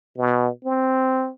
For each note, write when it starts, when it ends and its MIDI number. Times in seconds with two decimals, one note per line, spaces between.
0.17 0.48 47
0.64 1.30 60